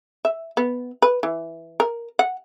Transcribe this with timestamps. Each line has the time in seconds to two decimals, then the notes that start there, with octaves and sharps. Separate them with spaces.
0.25 E5
0.57 B3
1.02 B4
1.23 E3
1.80 A#4
2.19 F#5